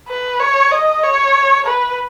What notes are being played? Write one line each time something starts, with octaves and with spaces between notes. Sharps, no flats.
B4
C#5
D#5
C#5
B4